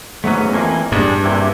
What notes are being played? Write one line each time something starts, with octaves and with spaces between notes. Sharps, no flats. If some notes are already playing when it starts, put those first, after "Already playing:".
E2 G#2 F#3 A3 B3 C#4
F2 E3 A#3 G#5
G2 G3 G#3 D4
A#1 C3 E4 G4